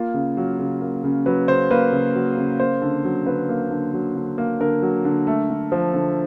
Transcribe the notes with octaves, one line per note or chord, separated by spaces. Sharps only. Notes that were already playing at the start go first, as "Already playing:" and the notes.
Already playing: A#3 F4
C#3
F#3
C#3
A#3
C#3
F#3 B4
C#3 C5
A#3 B4
C#3
F#3
C#3
A#3 C5
D3
F#3
D3 B4
A#3
D3
F#3
D3
A#3
D3 A#4
F#3
D3
A3
D3
F3
D3